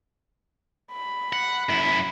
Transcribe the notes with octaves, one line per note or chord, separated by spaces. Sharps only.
B5
F#5
F#2 E4